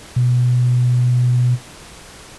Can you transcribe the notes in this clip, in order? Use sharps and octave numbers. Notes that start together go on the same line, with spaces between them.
B2